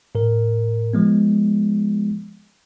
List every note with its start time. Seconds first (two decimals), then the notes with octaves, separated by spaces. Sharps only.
0.15 A2 A#4
0.93 F3 G#3 B3